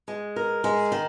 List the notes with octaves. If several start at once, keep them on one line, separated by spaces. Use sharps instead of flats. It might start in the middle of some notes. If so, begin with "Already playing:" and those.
G#3
A#4
G#3
D#3